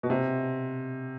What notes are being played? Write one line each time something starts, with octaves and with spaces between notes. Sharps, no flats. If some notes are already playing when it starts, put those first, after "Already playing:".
B2
C3